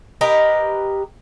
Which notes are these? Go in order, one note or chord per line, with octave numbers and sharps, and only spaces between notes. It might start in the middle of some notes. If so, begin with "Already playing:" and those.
G4 A#4 B4 D#5